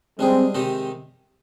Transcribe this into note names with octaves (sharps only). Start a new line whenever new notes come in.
G3 G#3 C4 D4 G#4
C3 D#3 G#3 D#4 G4